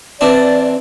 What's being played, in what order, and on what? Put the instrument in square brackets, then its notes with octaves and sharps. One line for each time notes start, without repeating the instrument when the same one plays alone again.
[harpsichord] E3 C4 D4 [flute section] D5